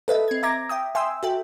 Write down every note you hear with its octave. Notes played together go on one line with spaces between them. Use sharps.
A4 B4 D#5 E5
C4 G#6
E5 A#5 D6 G#6 A#6
E5 G5 D#6
E5 G5 G#5 C6 D#6 E6
F#4 A4 E5 G5